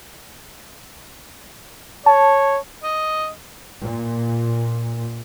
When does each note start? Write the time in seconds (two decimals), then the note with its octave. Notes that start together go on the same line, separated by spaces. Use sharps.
2.06 C#5 A5
2.84 D#5
3.82 A#2